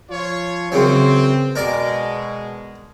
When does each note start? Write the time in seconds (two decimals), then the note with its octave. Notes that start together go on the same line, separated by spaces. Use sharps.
0.10 F3 F4 C#5
0.72 F#2 C#3 E3 C4
1.56 B2 G#3 A#4 D5 A#5